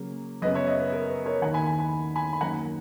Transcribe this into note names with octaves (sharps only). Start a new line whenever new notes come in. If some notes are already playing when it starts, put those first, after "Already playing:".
Already playing: C#3 F#3 A#3 C#4
F#2 C#3 F#3 B3 B4 D#5
C#5 E5
B4 D#5
B4
A#4
B4
A#4 C#5
D#2 D#3 A#3 F#5 A#5
G#5 B5
G#5 B5
G#5 B5
G#5 B5
B5
F#2 D#3 A#3 F#5 A#5